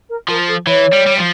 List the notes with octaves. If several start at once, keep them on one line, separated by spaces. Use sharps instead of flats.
A#4
F3 A#4
A4
E3 C#5
G3
G3
F3